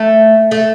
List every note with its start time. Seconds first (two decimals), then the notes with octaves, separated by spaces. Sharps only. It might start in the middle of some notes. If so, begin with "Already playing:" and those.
Already playing: A3
0.51 A3